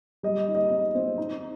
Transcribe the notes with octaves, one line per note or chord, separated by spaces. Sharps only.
G3 D#5
D#4
D#5
C4
C4
D#4